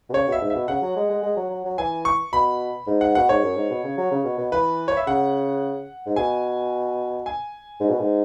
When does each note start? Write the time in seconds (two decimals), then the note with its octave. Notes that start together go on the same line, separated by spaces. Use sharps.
0.10 B2
0.13 C#3 C#5
0.28 B2
0.32 E5
0.41 G#2
0.50 B2 E5
0.68 C#3 F#5
0.82 F#3
0.96 G#3
1.10 G#3
1.23 G#3
1.37 F#3
1.50 F#3
1.65 F#3
1.78 E3 G#5
2.05 C#6
2.33 B2 B5
2.87 G#2
3.01 F#5
3.15 B2 F#5
3.29 G#2 C#5
3.43 F#2
3.56 G#2
3.70 B2
3.84 C#3
3.97 F#3
4.11 C#3
4.24 B2
4.38 B2
4.52 E3 B4
4.88 C#5
4.97 E5
5.07 C#3 F#5
6.06 G#2
6.16 B2 G#5
7.26 G#5
7.80 G#2
7.90 B2
8.00 G#2